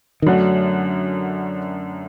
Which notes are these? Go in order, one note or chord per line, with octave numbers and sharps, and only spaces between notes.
D#3
F#2 D3 F#3 A3 D4 F#4